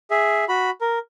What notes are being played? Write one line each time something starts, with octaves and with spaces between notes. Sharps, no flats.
G#4 E5
F#4 B5
A#4